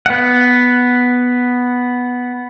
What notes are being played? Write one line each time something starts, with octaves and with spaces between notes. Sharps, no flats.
B3 F#5